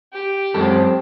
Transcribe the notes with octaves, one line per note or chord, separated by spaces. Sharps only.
G4
F#2 G#3 C4 A4